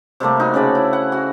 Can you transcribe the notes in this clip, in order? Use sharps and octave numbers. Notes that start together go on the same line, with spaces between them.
C3 G3 A3 A#3
D#4 F#4
C#3 C#4 D5 B5
E4
F#5
F#4